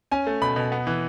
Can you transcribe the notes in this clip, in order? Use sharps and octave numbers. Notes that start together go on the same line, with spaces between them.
C#4 G#5
A3
B2 B5
B2
B3
E3